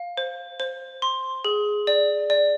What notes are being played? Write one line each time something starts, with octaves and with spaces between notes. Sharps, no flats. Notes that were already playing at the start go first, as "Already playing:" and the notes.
Already playing: F5
C5
C5
C6
G#4
D5
D5